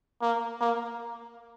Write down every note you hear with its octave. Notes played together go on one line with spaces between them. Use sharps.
A#3
A#3